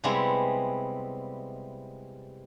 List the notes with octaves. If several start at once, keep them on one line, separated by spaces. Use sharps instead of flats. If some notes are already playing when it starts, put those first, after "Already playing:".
C3 G3 G#3 B3 E4